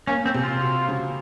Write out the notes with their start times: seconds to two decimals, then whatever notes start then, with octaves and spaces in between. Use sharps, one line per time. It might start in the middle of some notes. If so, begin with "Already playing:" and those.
0.07 A#3 C#4
0.26 C4
0.34 C3
0.44 F4
0.61 F#4
0.88 C#3